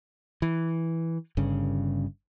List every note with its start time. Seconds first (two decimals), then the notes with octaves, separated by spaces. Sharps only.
0.42 E3
1.37 G1 G2 C#3